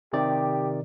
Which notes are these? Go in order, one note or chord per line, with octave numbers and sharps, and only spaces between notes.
C3 D#3 G4 D5